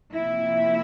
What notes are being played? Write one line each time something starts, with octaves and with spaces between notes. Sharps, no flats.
C3 F3 A#3 E4